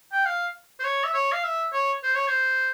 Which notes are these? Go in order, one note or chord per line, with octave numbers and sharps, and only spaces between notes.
G5
F5
C5
C#5
E5
C#5
F5
E5
C#5
C5
C#5
C5